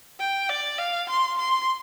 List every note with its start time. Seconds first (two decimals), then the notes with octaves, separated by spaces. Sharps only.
0.20 G5
0.49 D5
0.78 F5
1.09 C6
1.38 C6